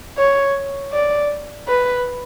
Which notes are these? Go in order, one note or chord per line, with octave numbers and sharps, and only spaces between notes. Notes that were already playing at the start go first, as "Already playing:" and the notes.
C#5
D5
B4